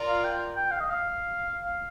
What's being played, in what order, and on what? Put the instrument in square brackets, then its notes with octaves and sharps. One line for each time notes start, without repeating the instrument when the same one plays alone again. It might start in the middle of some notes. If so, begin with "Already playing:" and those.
Already playing: [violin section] F4 A#4 D5
[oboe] F5
G5
G5
F5
D#5
F5
F5